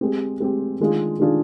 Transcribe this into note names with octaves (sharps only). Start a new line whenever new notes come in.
G#3 C4 G4
G#3 C4 G4
D#3 G#3 D4 F4 G#4
D#3 G#3 D4 F4 G#4